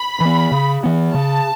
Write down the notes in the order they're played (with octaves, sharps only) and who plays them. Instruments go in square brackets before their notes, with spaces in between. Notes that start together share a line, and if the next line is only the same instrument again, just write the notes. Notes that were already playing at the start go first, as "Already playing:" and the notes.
Already playing: [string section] B5
[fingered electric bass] E3 B3
C#3
E3 B3
[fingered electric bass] C#3 [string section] A5